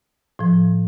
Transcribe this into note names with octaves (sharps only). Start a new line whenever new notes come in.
A2 F3